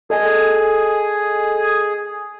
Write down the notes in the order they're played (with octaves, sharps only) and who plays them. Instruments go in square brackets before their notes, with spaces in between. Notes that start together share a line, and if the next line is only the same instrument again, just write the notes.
[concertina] G#4 [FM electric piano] A4 D#5 G#5